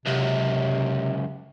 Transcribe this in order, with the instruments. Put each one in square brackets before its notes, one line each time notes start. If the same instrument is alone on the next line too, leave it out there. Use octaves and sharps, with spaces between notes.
[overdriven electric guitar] C#2 F#2 [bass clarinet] C3